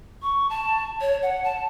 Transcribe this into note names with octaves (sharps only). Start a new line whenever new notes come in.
C#6
A5
C#5
F#5
A5